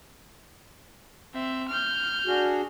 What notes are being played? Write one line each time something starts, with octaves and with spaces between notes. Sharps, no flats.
C4 E5
F6 G6
D4 F#4 G#4